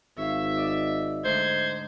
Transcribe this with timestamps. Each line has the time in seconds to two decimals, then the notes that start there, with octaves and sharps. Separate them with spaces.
0.18 G#1 C#5 E5 F5
0.56 D5 D#5
1.25 D2 G#2 D3 C5 G#6